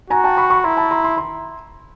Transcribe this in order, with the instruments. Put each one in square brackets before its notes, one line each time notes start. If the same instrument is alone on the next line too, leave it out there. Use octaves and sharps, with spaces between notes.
[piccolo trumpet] F#4 [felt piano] G#5 A#5
[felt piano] G5 A5
B5 C#6
B5 C#6
[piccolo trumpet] E4 [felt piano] A#5 C6
[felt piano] A5 B5
A#5 C6
A#5 C6
A#5 C6